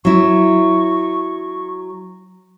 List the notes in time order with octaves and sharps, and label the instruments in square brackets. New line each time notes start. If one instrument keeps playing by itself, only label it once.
[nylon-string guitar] F#3 E4 [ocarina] C#6